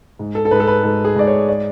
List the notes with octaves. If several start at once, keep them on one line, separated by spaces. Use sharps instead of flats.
G#2
A4
A4
G#2 B4
A4
B4
G#2 A4
G#4
G#2 D5
C#5
D5